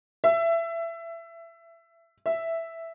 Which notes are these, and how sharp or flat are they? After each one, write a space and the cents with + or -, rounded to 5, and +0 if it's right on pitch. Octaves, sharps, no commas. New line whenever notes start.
E5 +20
E5 +0